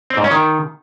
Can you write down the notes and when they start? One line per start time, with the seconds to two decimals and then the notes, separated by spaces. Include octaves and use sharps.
0.10 C4
0.17 G#2
0.24 C#4
0.31 D#3